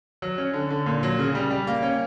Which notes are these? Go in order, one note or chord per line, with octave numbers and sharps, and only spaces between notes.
F#3
C#4
D3
D3
A#2
F#3
C#3
G3
G3
A#3
C#4